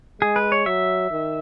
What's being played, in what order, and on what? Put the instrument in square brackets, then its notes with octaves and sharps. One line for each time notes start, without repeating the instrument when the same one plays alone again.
[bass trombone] G#3 [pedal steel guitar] G#4
[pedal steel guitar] B4
C#5
[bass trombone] F#3 [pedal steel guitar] E5
[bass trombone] D#3